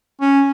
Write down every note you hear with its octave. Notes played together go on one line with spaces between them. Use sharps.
C#4